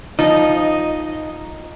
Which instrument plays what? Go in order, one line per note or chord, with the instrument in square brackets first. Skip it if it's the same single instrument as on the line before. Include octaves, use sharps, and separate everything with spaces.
[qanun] F3 [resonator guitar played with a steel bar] D#4 [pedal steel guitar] D#5